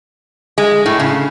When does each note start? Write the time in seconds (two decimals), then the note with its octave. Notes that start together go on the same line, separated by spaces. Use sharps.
0.58 G#3
0.86 A2
1.00 C#3